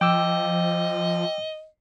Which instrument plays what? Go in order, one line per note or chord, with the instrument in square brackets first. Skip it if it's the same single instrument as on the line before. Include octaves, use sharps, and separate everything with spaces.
[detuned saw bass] F3 [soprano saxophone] D#5 [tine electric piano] G5 D6 E6